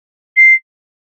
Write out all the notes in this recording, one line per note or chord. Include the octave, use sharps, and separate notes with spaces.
C7